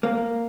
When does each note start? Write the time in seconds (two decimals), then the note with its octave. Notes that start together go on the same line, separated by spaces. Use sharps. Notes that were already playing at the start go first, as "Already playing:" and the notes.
0.03 A#3